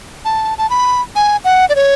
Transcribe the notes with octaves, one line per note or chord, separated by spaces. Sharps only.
A5
A5
B5
G#5
F#5
D5
C#5